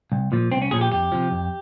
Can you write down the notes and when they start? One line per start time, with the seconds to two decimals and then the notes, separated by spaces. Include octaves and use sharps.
0.12 C2
0.32 A#2 F3
0.52 C2 C4
0.62 C#4
0.71 A#2 F3 G#4
0.81 G4
0.92 F2 G4
1.12 C3 F3
1.31 F2